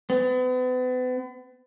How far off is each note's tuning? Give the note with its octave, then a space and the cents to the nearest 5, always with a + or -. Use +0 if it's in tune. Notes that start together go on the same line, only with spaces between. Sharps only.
B3 +40